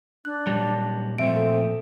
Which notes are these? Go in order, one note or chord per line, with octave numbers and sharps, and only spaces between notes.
D4 F#6
A#2 F#3 G3 A5
A#2 F3 A3 C4 E5 D7
A4